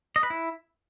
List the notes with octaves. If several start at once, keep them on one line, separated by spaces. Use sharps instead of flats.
D#5
B4
E4